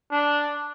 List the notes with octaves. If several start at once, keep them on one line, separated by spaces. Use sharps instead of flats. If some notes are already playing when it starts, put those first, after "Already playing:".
D4